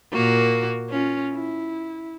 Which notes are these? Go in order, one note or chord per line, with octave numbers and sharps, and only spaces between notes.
A#2 A#3 F#4
C#4 F4
E4